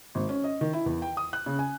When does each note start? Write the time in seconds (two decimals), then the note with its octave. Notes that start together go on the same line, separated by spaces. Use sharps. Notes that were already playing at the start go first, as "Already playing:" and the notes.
0.15 G#1
0.29 C#4
0.44 D#5
0.61 D#3
0.73 E4
0.86 E2
1.02 G5
1.17 D#6
1.33 F#6
1.46 C#3
1.59 G#5